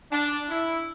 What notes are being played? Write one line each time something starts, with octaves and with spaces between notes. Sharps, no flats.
D4
E4